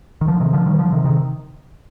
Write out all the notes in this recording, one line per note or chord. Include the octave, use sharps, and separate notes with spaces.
D#3
D3 F3
C3 D#3
D3 F3
D#3 G3
D3 F3
C3 D#3
C3 D#3